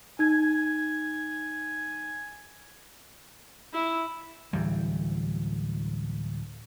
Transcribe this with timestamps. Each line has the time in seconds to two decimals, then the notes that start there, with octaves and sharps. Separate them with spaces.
0.19 D#4 G#5 G#6
3.73 E4
4.53 D1 E3 G3